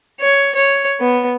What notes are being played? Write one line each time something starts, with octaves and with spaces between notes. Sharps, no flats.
C#5
C#5
B3